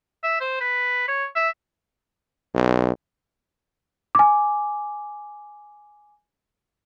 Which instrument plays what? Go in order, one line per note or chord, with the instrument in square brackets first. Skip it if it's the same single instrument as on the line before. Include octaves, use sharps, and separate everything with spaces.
[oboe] E5
C5
B4
C#5
E5
[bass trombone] B1
[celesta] G#5 D6